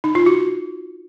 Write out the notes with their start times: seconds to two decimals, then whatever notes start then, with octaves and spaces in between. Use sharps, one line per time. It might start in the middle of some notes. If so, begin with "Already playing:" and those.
0.04 D#4
0.15 F4
0.26 F#4